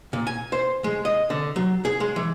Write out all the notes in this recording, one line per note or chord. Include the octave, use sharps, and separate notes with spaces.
A#2
G#5
C5
G#3
D#5
D3
F#3
G#4
G#3
E3